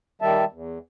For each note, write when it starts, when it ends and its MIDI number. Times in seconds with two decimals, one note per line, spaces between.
0.22 0.45 51
0.22 0.45 55
0.22 0.45 76
0.22 0.45 81
0.52 0.78 40